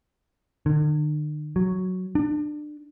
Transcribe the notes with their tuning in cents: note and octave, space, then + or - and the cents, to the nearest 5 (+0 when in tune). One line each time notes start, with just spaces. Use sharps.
D3 +45
F#3 +0
D4 +25